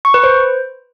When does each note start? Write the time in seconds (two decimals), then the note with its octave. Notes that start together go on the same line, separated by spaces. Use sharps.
0.05 C#6
0.14 B4
0.24 C5